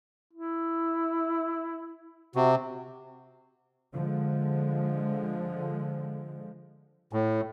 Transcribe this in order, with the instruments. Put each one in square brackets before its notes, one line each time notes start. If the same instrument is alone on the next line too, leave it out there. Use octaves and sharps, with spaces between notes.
[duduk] E4
[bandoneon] C3 [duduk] F#4
[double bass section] D3 F3 G#3
[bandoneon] A2